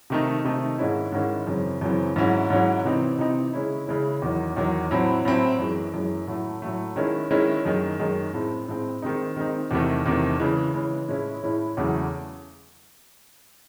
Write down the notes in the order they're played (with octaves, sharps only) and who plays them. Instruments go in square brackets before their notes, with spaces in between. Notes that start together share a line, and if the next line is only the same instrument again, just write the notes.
[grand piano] C3 D#3 A3 D#4
C3 D#3 A3 D#4
G#2 D#3 G#3 C#4 E4
G#2 D#3 G#3 C#4 E4
F#2 C#3 E3 C4
F#2 C#3 E3 C4
G#2 F#3 C#4 E4
G#2 F#3 C#4 E4
C3 E3 C4 D#4
C3 E3 C4 D#4
C#3 G#3 C#4 E4
C#3 G#3 C#4 E4
E2 D#3 F#3
E2 D#3 F#3
A2 F#3 C4 E4
A2 F#3 C4 E4
F#2 E3 G#3
F#2 E3 G#3
A2 F#3 A3
A2 F#3 A3
D#3 G#3 C#4 E4
D#3 G#3 C#4 E4
F#2 D#3 G#3
F#2 D#3 G#3
A2 G#3 C4
A2 G#3 C4
D#3 G#3 C4 D#4
D#3 G#3 C4 D#4
E2 C3 D#3 A3
E2 C3 D#3 A3
C#3 E3 G#3
C#3 E3 G#3
A2 G#3 C#4 E4
A2 G#3 C#4 E4
E2 C#3 F#3 A3